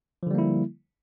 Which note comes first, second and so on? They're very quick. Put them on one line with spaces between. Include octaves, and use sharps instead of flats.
F3 D3 G3 A#3 E4